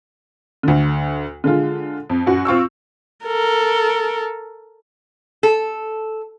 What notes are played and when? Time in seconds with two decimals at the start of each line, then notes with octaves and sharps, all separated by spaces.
0.63 D2 D3
1.44 D3 G#3 F4
2.10 F2
2.26 F#2 F#4
2.45 C4 F4 C#6 E6
3.26 A4 A#4
5.43 A4